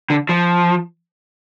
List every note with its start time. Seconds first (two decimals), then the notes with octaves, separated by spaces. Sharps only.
0.10 D3
0.29 F3